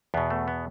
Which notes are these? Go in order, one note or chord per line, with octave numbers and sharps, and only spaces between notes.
E2 B2 B3
A3
B3